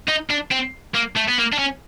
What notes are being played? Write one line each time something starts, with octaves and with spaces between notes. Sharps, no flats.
D#4
D4
C4
A#3
A3
B3
A#3
D4
C#4